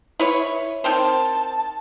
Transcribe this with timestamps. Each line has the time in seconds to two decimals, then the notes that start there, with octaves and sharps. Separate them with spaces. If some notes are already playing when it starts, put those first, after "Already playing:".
0.20 E4 B4 C#5
0.84 D#3 C4 C5 A5